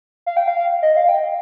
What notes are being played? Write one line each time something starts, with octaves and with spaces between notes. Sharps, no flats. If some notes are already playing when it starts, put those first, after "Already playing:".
F5
G5
F5
D#5
F5
G5